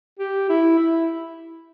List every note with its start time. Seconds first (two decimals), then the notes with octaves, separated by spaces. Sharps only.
0.19 G4
0.49 E4
0.78 E4